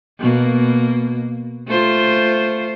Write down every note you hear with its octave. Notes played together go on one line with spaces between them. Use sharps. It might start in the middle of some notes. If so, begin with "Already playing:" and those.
B2 A#3
A3 F4 C5